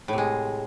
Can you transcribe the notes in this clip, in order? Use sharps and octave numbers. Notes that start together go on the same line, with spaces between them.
A2 C3 G#3